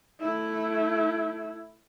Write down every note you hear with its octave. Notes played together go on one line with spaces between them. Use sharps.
A3 E4